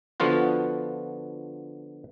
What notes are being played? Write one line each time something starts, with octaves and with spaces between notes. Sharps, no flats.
D3 F3 B3 F4 F#4